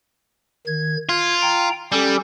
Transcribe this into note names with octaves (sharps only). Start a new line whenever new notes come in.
D#3 G#6
F4 G#6
G5 A#5
G3 C#4 G4 A4